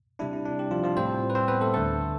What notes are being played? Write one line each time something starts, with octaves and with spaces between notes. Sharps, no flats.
C3 G3 D4 E4
E4
D4
G4
F3 F4
F3 F4
A2 G3 C4 C5
B4
C4 C5
B3 B4
A3 A4
D2 D3 A3 A4